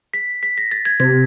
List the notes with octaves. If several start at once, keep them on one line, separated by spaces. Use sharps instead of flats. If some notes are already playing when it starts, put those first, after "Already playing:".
B6
B6
A#6
A6
G#6
C3 G#6